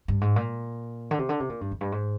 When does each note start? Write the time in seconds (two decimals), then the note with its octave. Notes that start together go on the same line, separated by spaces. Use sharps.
0.08 G2
0.21 G#2
0.36 A#2
1.11 D3
1.19 C3
1.29 D3
1.40 C3
1.50 A#2
1.61 G2
1.71 F2
1.81 G2
1.92 G#2